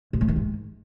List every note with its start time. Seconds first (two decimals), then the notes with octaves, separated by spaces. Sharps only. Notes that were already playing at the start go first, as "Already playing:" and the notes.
0.13 A2
0.21 A3
0.28 D#3
0.36 G#2